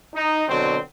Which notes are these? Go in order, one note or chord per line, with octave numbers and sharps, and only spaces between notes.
D#4
B2 D3 F#3 C4